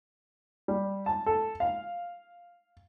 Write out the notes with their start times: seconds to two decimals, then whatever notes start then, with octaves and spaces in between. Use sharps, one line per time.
0.68 G3
1.06 A5
1.26 A4
1.60 F5